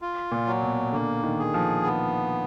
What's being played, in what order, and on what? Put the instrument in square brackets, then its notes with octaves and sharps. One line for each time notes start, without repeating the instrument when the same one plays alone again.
[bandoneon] F4
[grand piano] A#2
[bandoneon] F#3
[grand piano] B2
[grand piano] D3 [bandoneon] A#3
[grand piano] D#3
[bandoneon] G#4
[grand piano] F3
[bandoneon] B3